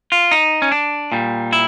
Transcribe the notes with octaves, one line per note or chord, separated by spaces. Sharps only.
F4
D#4
C#4
D4
A#2 G3
E4